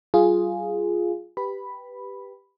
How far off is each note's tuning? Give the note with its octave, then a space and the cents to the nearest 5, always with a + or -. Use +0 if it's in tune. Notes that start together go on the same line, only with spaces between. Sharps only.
G3 -40 F4 +0 G#4 +0
G4 +0 B4 +0 B5 +0